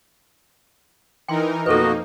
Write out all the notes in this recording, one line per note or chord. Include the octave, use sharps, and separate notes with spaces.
E3 D#4 A#4 G5 C6
F2 B2 A#3 D#4 F#4 A4 B4 D#5